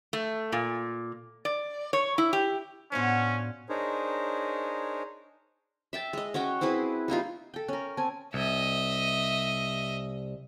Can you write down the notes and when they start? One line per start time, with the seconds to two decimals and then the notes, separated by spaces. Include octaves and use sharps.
0.13 A3
0.52 A#2
1.45 D5
1.93 C#5
2.18 E4
2.33 G4
2.92 A2 B3 C#4 D4 F4 F#4 C5
3.69 D4 D#4 G#4 A#4 C5 C#5
5.93 E5 G5 A5
6.13 G#3 D#5
6.34 C#4 F#4 C#5 G5
6.61 C4 E4 G#4 B4
7.08 G3 A#3 D#4 F4
7.54 A4 G5
7.68 C#4 A#4
7.97 C4 G#5 A5
8.34 C2 D#5 E5